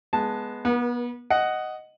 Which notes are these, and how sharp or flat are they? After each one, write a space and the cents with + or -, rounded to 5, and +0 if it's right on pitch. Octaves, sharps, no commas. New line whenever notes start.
G#3 +10 B3 -5 A5 +0
B3 -30 A#4 +45
D#5 +0 F#5 +10